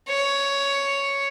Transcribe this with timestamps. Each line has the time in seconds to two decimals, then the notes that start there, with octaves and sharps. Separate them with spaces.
0.09 C#5